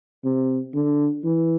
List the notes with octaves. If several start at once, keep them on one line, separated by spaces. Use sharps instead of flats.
C3
D3
E3